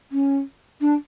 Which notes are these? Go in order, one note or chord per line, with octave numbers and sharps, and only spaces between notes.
C#4
D4